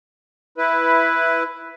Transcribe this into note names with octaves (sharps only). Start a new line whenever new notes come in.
E4 B4